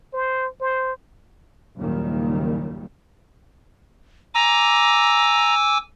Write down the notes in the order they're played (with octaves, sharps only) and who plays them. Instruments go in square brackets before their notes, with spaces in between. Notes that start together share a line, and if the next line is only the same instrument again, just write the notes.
[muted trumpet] C5
C5
[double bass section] F#1 D#2 A#2 D#3 G3
[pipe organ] G#5 D6 E6 [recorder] A#5